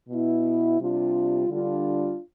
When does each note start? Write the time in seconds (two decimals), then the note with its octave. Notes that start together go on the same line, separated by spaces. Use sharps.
0.09 B2 B3 E4
0.78 C3 G3 D4 F4
1.49 D3 G3 D4 F4